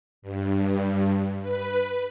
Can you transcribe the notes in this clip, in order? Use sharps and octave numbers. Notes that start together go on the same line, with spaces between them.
G2
B4